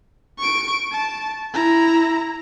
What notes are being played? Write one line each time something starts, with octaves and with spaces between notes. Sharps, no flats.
C#6 D7
A5
E4 A#5